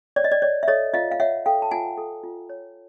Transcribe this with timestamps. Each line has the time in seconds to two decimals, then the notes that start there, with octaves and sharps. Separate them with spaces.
0.16 C#5 D5
0.24 D#5
0.32 D5
0.42 C#5 D5
0.63 E5
0.68 A4 C#5 D#5
0.94 F4 D#5 F5
1.11 F5
1.20 C#5 E5 F#5
1.46 A4 F5 G5
1.62 A5
1.71 F4 F#5 G#5
1.97 A4
2.24 F4
2.49 C#5